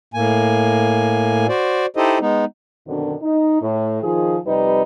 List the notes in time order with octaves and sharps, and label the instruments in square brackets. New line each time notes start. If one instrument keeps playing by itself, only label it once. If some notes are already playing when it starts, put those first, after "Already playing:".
[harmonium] A2 A#3 G#5
F#4 C5 D5
D#4 E4 G4 A4 C5 D#5
G#3 B3 D#4
[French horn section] F#2 B2 D3 D#3 C4 D4
D#4
A2
D#3 F3 G#4
F2 C3 G3 D#4 B4